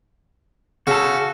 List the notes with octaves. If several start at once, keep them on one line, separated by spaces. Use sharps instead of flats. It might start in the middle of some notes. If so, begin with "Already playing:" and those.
C#3 F#4 A4